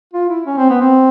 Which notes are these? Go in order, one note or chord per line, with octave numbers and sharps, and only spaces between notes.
F4
E4
C#4
C4
B3
C4